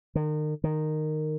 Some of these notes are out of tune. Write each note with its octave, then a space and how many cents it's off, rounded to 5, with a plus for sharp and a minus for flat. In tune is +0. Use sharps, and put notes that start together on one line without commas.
D#3 -35
D#3 -15